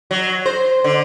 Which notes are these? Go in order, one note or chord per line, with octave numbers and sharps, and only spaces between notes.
F#3
C5
D3